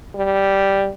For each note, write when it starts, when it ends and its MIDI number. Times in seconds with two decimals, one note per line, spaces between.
0.15 0.90 55